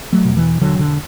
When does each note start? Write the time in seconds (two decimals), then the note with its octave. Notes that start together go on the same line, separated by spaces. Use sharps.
0.12 F#3 A3
0.25 E2 B2
0.37 E3
0.61 E1 D3 F#3
0.79 D3